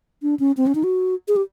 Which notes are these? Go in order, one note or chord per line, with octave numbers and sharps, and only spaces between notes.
D4
C#4
C4
C#4
D#4
F#4
G#4
G4